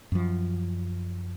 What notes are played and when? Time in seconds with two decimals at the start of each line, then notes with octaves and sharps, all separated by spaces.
0.12 F#2 F3